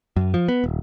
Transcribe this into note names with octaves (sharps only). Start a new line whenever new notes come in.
F#2
F3
B3
D#1